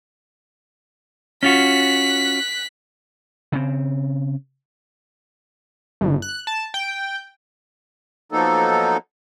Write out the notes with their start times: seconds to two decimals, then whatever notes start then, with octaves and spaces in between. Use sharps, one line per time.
1.43 C#4 F4 F#4 F#6 B6
3.52 C#3 C4
6.01 G1
6.22 F#6
6.47 A5
6.74 G5
8.32 F3 F#3 A#3 B3 D#4 A4